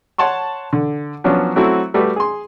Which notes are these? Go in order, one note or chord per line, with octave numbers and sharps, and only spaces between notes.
C#5 F#5 A5 C6 C#6
D3
F3 F#3 B3 C#4 D4
F#3 A3 C4 E4 F#4
G3 A3 F#4 B4
G#4 C6